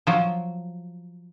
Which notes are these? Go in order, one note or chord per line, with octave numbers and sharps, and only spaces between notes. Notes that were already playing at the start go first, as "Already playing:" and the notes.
F3 F#3